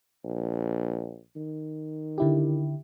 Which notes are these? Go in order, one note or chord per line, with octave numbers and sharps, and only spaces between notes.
A#1
D#3
D3 E4 G4